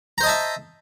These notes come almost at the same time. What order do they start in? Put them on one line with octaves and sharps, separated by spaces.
A#5 C5 D#5 A5 E5